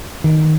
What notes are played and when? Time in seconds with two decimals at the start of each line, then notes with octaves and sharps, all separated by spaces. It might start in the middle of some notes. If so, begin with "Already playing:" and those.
0.24 D#3